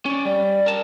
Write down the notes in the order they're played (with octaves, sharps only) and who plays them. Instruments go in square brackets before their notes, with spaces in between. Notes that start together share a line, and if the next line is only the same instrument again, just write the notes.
[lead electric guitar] C#4 D5
[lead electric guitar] G3 [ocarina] D5
[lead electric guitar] A#4 A5